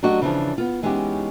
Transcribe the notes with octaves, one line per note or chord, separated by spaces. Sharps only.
F#3 A3 D4 F#4 G4 D#5
C#3 E3 F3 D4 G#4
B3 F4
E3 G#3 B3 C#4 D#4 G4